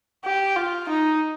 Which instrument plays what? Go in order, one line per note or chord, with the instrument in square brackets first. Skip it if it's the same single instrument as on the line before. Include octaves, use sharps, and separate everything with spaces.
[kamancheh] G4
F4
D#4